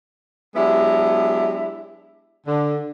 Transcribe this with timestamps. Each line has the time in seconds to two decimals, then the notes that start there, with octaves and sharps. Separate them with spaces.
0.56 F#3 G#3 B3 D4 E4 G4
2.47 D3